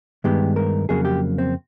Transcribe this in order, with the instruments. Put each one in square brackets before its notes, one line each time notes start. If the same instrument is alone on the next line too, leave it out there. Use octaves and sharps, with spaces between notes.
[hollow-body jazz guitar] G2 D#3 G#3 B3 G4
A#4
F2 C#3 F#3 A#3 G#4
G4
C4